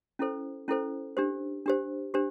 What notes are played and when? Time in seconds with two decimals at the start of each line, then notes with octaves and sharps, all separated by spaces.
0.19 C#4 E4 A4 C5
0.68 C#4 E4 A4 C5
1.17 D4 G4 C5
1.66 D4 G4 C5
2.14 D4 G4 C5